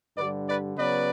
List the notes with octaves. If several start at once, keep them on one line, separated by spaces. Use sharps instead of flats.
G2 D3 G3 B4 D5
B4 D5
C#3 F#3 B3 B4 D5